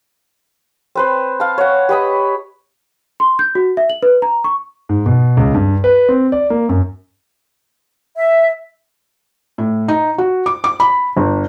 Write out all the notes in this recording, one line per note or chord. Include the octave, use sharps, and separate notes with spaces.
C4 B4 C5
F5 A5
C#5 F#5
G4 B4 D#5 B5
C6
G6
F#4
E5
F#7
B4
A#5
C#6
G#2
B2
C#2
G2
B4
C4
D5
A#3
F#2
E5
A2
D#4
F#4
D6
D6
B5
G1